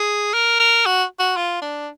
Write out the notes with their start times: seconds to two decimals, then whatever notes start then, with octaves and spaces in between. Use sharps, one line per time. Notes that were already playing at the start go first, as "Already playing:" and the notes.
Already playing: G#4
0.34 A#4
0.60 A#4
0.86 F#4
1.19 F#4
1.37 F4
1.62 D4